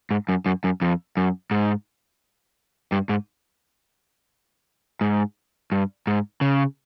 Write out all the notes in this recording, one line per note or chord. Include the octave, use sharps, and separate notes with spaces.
G#2
F#2
F#2
F#2
F2
F#2
G#2
G2
G#2
G#2
G2
G#2
C#3